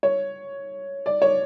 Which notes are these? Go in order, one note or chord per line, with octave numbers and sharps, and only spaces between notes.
C#5
D5
C#5